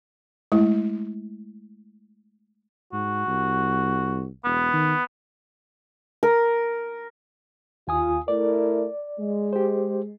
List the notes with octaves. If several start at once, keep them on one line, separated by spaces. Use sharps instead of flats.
G#3 A3 E4
G#2 F#4
C2
E1 B3
D#3
A#4
D#2 F4 G#5 D#6
A3 E4 A#4 D5
G#3
G4 C5